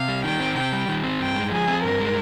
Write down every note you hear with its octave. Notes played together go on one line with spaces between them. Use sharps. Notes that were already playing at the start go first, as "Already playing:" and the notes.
Already playing: C3 F5
G3
D#3 G5
C4
C3 G5
G3
D#3
C4
G2 G5
G#3
F3 G#4
C4
G2 A#4
G#3